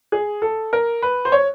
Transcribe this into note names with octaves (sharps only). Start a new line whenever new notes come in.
G#4
A4
A#4
B4
C5
C#5